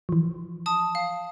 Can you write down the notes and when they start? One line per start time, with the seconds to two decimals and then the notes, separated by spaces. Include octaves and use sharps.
0.09 E3 F3
0.66 A5 D#6
0.95 F5